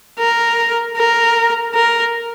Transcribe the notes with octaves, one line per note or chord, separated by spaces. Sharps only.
A#4
A#4
A#4